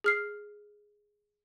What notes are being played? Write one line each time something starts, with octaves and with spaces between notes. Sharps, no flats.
G#4 F6 C7